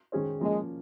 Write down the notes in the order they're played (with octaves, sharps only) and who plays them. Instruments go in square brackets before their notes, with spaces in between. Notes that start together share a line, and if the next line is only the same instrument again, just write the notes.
[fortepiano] D#3 G#3 C#4 G#4 C5
[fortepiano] F3 A#3 C#4 [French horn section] G#3